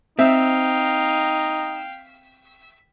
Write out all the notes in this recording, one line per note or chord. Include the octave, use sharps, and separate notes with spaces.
C4 D#4 E5 F5 G5